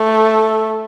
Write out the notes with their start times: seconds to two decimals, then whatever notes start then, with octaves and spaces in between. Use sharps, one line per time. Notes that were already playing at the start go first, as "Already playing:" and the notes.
Already playing: A3